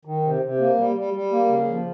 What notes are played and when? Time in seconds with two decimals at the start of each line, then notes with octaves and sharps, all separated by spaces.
0.05 D#3
0.23 C3
0.42 C3
0.60 A#3
0.78 G3
0.96 G3
1.14 G3
1.32 A#3
1.50 C#3
1.68 F3